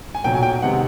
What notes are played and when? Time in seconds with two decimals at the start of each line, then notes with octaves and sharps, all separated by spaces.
0.15 G#5
0.24 B1 A#2 F#3 G5
0.35 G#5
0.43 G5
0.62 C3 D#3 G#3 B3 F#5